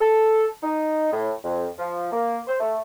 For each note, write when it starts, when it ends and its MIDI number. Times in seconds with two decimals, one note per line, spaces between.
0.01 0.46 69
0.63 1.11 63
1.12 1.31 45
1.44 1.68 41
1.79 2.09 53
2.13 2.40 58
2.48 2.57 72
2.60 2.78 57